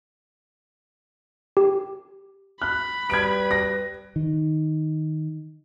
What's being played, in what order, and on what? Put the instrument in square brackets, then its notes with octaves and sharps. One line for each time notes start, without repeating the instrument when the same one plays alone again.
[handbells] G4
[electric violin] B5 [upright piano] F#6
[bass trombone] G3 [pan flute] B4 [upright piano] G#6 D7
[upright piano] A#6
[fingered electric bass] D#3